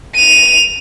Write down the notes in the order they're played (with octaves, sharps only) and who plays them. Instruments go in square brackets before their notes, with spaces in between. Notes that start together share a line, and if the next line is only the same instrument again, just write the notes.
[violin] D#7 F7